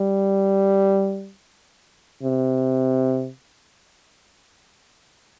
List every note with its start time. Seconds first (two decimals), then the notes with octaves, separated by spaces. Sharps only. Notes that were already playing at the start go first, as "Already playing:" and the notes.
Already playing: G3
2.23 C3